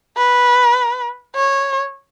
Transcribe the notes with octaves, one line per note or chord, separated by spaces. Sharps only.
B4
C#5